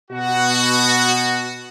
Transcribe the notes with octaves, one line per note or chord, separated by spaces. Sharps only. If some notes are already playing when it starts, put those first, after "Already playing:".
B2 F#4